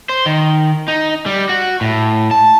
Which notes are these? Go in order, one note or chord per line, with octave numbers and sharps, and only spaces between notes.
C5
D#3
D#4
G3
F#4
A2
A5